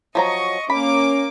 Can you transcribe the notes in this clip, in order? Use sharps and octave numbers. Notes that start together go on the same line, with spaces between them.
F3 F#3 D#5 A#5 C#6
A#3 C#4 B5 D6